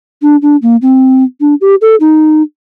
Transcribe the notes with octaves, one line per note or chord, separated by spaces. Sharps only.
D4
D4
A#3
C4
D4
G4
A4
D#4